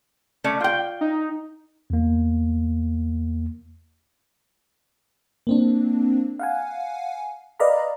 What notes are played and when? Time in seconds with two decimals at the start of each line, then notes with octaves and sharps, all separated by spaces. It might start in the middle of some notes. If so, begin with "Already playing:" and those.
0.44 A3 C#4 D5
0.60 F4 G5
1.01 D#4
1.90 E2 A#3
5.47 A#3 C4 D4
6.39 F5 F#5 G#5
7.60 B4 D5 D#5 F5 A#5 B5